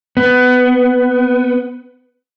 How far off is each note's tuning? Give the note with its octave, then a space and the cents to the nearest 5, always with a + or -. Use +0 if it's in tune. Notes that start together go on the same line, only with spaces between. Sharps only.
B3 +15